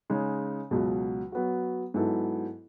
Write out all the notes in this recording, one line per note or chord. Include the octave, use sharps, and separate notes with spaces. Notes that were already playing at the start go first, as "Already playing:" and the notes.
C#3 G#3 D#4
C#2 B2 F#3
F#3 B3 F#4
G#2 F#3 B3 E4 A4